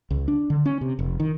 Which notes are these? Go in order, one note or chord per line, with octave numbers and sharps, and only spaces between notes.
C#2
D4
D3
C#4
C3
F1
D#3